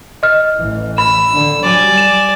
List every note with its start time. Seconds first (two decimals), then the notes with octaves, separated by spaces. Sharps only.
0.23 D#5 F6
0.56 A1 E3
0.98 B5 E6
1.33 D3
1.63 G3 D5 G#5
1.98 E7